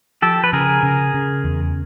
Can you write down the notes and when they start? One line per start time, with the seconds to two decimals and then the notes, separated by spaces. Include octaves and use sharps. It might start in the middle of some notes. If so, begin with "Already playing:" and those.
0.22 F3 G4 A4
0.44 B4
0.53 C#3 G#4 A#4
0.83 C#3
1.14 C#3
1.44 E2